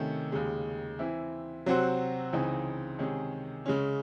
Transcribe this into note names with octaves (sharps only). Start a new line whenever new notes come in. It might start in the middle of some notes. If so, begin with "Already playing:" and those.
Already playing: C3 D#3 A3 C#4
D#2 C#3 G#3
E3 C4 E4
C3 F#3 C4 F#4 C5
C#2 C#3 E3 C4 D#4
C3 D#3 G#3 C#4 G#4
C#3 G#3 C#4